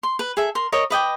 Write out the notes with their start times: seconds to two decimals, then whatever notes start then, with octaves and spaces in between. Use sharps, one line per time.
0.03 C6
0.19 B4
0.37 G#4 A4 E5
0.55 A#4 C6
0.72 A#4 C#5 D#5
0.90 B4 D#5 G5 D6